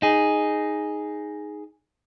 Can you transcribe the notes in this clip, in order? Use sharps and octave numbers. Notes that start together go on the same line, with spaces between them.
D#4 G#4